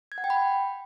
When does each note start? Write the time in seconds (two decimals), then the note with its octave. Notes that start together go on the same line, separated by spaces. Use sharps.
0.12 G#6
0.18 F#5
0.24 G5
0.30 B5